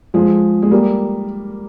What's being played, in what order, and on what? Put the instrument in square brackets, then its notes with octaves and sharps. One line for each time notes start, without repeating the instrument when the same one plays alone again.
[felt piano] F3 G#3
G#3
G3 A#3